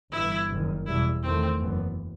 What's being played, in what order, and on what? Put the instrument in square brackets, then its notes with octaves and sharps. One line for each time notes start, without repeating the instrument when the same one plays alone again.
[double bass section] G1 G2 E3 [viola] E4
[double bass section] F#1 F#2 D#3
[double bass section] E2 B2 G3 [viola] E4
[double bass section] E2 D#3 A3 [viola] C4
[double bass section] F#1 F#2 E3 B3